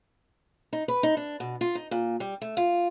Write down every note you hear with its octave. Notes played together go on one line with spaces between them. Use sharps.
D#4
B4
D#4
D4
B2
F4
D#4
A#2
G3
A3
F4